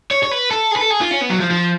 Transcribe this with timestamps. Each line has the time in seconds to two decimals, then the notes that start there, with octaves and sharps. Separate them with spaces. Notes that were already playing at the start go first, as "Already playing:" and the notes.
0.11 C#5
0.23 C#5
0.31 B4
0.51 A4
0.71 G#4
0.76 B4
0.81 A4
0.90 G#4
1.01 F4
1.11 C#4
1.21 B3
1.30 F#3
1.40 F3
1.50 F3